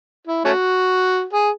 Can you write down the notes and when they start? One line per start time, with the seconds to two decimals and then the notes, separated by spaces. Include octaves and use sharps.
0.27 E4
0.45 A3 C#4 F#4
1.33 G#4